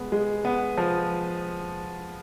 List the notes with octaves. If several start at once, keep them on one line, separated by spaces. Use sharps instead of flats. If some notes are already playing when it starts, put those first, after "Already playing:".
Already playing: G#3 B3
G#3
B3
F3